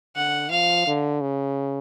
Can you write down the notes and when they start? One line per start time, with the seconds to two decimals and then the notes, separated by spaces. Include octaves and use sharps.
0.16 D3 F#5
0.51 F3 F5
0.86 D3
1.21 C#3